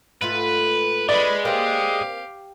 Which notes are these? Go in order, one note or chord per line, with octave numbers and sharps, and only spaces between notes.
G#2 A3 F4 B4
G#3 B4 D5 B5
A#3 C4 G4 F5